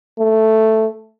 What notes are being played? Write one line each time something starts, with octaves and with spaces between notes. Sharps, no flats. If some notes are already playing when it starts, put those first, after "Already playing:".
A3